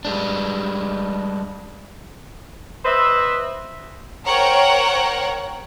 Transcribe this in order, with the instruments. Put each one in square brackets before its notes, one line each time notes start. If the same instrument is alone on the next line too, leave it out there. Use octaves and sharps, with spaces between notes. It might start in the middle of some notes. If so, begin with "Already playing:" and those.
[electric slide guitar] G3 G#3 D4
[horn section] B4 C5 D#5 E5
[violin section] A#4 C5 C#5 F#5 G5 A#5